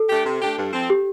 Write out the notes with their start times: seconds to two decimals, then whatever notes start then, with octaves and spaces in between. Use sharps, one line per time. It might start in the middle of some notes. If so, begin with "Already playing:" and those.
Already playing: A4
0.09 A3 D4 G4
0.25 C3
0.41 A3 D4 G4
0.57 G2
0.73 F3 C4
0.90 G4